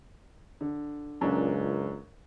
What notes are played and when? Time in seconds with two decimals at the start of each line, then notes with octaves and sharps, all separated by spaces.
0.61 D3
1.21 C#2 F#2 A#2 D4